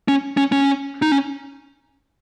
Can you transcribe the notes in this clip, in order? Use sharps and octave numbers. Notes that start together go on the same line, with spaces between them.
C#4
C#4
C#4
D#4
C#4